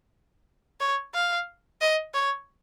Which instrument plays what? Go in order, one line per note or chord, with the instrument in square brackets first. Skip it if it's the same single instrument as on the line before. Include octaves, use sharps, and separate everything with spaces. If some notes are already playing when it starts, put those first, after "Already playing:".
[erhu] C#5
F5
D#5
C#5